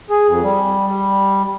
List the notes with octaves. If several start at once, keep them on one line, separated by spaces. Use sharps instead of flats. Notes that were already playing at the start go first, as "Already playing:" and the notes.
G#4
F2
G3
G3